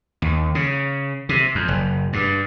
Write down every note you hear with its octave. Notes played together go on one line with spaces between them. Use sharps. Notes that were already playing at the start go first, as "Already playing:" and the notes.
D#2
C#3
C3
F2
F#1
G2